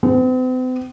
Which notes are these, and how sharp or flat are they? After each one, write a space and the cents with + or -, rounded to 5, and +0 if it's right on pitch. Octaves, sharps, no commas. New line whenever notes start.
C4 -45